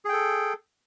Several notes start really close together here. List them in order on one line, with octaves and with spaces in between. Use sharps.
G#4 G5 A4